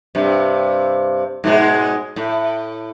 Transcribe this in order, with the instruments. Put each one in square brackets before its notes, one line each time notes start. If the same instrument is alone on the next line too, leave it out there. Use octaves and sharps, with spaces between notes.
[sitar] G2 C3
G#2 B2 G#3
A2